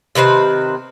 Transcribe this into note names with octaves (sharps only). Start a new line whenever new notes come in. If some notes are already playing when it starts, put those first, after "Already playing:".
C3 D#3 B4 C5